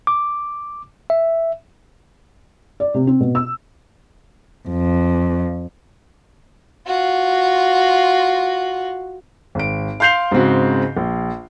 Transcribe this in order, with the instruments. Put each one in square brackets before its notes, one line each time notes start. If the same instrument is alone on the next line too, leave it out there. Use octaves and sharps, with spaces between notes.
[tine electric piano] D6
E5
[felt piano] D5
C3
C4
B2
E6
[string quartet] F2
[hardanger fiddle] F4 F#4
[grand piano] G#1 D7
F5 C6 G6 C7 F7
G#2 C#3 C4 F#4
A#1